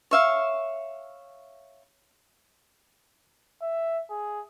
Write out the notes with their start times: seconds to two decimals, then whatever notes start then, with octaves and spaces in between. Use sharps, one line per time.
0.11 C#5 E5 F5
3.62 E5
4.10 G#4